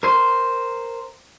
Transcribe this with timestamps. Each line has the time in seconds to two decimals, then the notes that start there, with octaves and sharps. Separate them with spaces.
0.03 A#4 C5